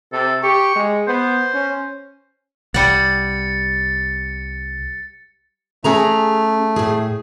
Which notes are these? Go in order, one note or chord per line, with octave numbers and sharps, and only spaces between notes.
C3 A4
G4 C#6
G#3
B3 C5
C#4
C2 G3 F#5 A6 C#7
A3 C#4 G#4 A#5
A2 G#4